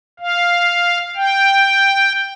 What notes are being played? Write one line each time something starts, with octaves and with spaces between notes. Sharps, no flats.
F5
G5